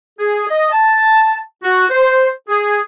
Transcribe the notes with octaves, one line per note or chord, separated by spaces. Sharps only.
G#4
D#5
A5
F#4
C5
G#4